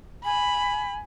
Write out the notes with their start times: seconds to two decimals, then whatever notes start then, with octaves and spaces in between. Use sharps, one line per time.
0.25 G#5 B5